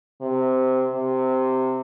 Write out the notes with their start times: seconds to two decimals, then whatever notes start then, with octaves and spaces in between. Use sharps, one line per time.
0.22 C3
0.92 C3